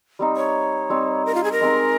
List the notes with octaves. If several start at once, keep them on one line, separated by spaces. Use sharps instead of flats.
G3 C4 D#4
C#5
G3 C4 D#4
A#4
F4
G#4
A#4
G#3 C4 D#4